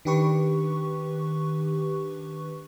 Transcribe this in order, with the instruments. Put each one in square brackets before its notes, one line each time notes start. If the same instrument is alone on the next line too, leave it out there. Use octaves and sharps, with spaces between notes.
[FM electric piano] D#3 D4 G4 B4 C#6